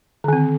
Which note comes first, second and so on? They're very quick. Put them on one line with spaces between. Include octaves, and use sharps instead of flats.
D3 D#3 C4